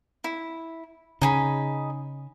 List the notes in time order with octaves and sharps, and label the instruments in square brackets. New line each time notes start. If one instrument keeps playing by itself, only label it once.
[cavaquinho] E4
[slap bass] C#3 [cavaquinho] D#4 G#4 B5